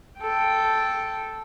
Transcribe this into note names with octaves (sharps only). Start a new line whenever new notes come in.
A4 G5